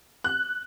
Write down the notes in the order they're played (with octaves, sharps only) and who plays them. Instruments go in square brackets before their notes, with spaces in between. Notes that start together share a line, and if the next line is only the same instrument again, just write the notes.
[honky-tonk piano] F#6